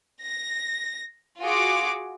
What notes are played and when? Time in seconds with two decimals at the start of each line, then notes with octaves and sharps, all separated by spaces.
0.22 A#6
1.41 F4 F#4 G#4 D6